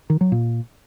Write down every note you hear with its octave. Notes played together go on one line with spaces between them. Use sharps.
D#3
F#3
A#2